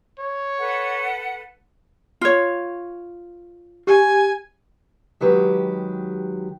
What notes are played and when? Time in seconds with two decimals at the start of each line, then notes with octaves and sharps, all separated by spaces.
0.19 C#5
0.59 A4 B4 F#5
2.21 F4 C#5
3.87 G4 G#5
5.21 D#3 F#3 G#3 G4 B4